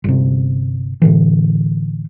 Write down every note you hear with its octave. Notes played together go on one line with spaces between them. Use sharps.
G1 C3
A2 D3 E3